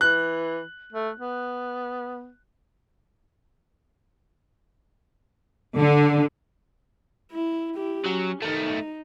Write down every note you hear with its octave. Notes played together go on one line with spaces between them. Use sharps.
E3 F#6
A3
B3
D3
E4
E4 G4
F#3 C#4
D#3 A3 D#4